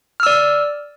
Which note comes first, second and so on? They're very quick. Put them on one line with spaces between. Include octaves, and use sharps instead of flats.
F6 E6 D5